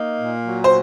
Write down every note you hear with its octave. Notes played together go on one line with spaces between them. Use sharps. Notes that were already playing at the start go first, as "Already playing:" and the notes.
Already playing: A#3 D#4
A#2
F#3
C5